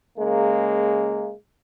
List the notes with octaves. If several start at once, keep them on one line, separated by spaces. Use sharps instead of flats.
C#3 G#3 A#3